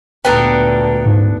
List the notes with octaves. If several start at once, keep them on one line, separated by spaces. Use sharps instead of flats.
D2 A#2 B3 D4 A4 G5 A#5
G#2